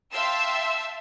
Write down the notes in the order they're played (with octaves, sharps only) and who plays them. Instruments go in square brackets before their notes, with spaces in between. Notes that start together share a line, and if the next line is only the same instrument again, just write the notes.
[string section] E5 F5 G5 A5 C6 E6